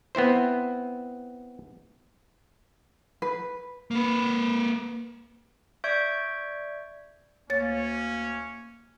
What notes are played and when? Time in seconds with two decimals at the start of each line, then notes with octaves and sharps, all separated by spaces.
0.15 B3 C4 E4 C5
3.22 B4
3.91 A#3 B4
5.84 D5 E5 C#6 G6 G#6 D7
7.50 D2 A#3 C#4 C#5 A6